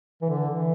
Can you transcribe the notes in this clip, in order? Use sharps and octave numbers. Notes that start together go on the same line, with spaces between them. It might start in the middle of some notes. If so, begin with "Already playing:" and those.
E3
D3
E3